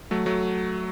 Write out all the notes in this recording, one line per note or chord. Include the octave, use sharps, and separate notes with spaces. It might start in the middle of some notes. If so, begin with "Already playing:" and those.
F#3 A3
F#3 A3